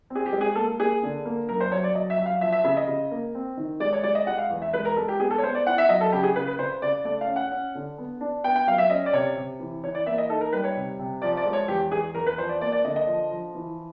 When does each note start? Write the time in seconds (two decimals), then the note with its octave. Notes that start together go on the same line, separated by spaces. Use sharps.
0.10 C4
0.15 G#4
0.26 G4
0.33 G#3
0.41 G#4
0.55 A#3 A4
0.79 A#3 G#4
1.03 D3
1.25 A#3
1.49 F#2 A#4
1.60 C5
1.72 F#3 C#5
1.84 D5
1.95 F#3 D#5
2.10 E5
2.18 F#3
2.26 F5
2.41 F3 E5
2.52 E5
2.64 C#3 E5
2.77 D#5
2.88 C#3
3.11 A#3
3.35 C4
3.57 D#3
3.80 G#3 D5
3.93 C#5
4.03 G#3 D5
4.15 D#5
4.27 G#3 F#5
4.38 F5
4.50 E2
4.62 E5
4.73 G#3 B4
4.85 A#4
4.96 G#3 A4
5.08 G4
5.20 B3 G#4
5.31 A4
5.38 C#5
5.43 B3 C5
5.55 D5
5.66 E4 F#5
5.78 E5
5.89 F#3 D#5
6.01 A4
6.12 C#3 G4
6.23 G#4
6.36 C#3 B4
6.47 B4
6.59 C#3 C5
6.82 C#3 D5
7.05 A3 D5
7.21 F5
7.28 C#4
7.36 F#5
7.52 C#4
7.75 D3
7.98 B3
8.21 D4
8.44 B3 G5
8.56 G5
8.67 F#3 F5
8.78 E5
8.90 C#4 D#5
9.06 D5
9.13 C3 C#5
9.36 C3
9.59 E3
9.84 E3 C#5
9.95 D5
10.06 A#3 E5
10.18 D#5
10.30 D#4 A4
10.41 A#4
10.53 G3 B4
10.64 C#5
10.77 C3
10.99 C3
11.22 F3 D5
11.37 D5
11.46 G#3
11.53 C#5
11.68 E2 G4
11.92 E2 G#4
12.15 E2 A#4
12.27 B4
12.38 F3 C5
12.49 D5
12.61 A#3 D5
12.72 D5
12.84 D3 D#5
12.96 D#5
13.07 F3
13.31 F3
13.55 E3